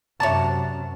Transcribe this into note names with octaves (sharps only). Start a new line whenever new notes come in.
F#2 C3 C#5 D5 E5 A5 A#5